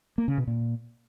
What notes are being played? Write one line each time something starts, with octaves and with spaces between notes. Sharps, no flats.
A#3
C#3
B2
A#2